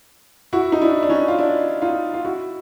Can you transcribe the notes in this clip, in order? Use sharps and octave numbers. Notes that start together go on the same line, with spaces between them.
E4 F#4
D#4
D4 E4
D4
C#4 D#4
F4
D4 E4
D#4 F4
F4
E4 F#4